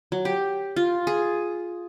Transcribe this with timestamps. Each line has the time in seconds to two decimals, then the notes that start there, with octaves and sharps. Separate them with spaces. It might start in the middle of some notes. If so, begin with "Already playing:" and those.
0.12 F#3
0.25 G4
0.76 F4
1.07 G#4